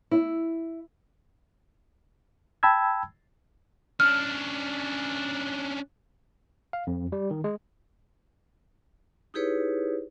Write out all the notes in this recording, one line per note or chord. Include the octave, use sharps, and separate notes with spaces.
E4
G5 A5 B5 E6 G#6
C#4 D4 F6
F5
F2
G3
D#3
G#3
D#4 E4 G4 G#4 B4 C#5